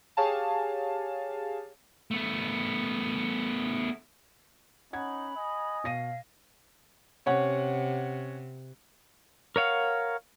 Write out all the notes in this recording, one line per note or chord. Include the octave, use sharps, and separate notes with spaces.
G4 G#4 C#5 F5 G#5 A5
A3 B3
C#4 D#4 F#5 B5 G#6
D#5 G#5
B2 F5 A#6 D#7
C3 C#4 C#5 F#5
A#4 C#5 F5 F#5